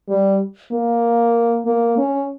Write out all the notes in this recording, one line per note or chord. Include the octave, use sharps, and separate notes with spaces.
G3
A#3
A#3
C#4